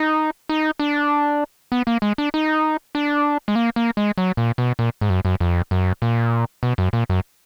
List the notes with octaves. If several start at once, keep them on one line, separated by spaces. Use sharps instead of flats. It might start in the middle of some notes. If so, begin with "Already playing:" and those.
Already playing: D#4
D#4
D4
B3
A#3
G#3
D4
D#4
D4
G#3
A#3
A#3
G#3
F#3
A#2
B2
A#2
G#2
F#2
F#2
F2
F#2
A#2
B2
F#2
A#2
F#2